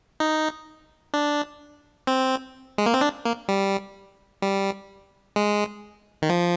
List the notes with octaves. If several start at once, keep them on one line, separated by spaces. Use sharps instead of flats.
D#4
D4
C4
G#3
A#3
C4
D4
A#3
G3
G3
G#3
D#3
F3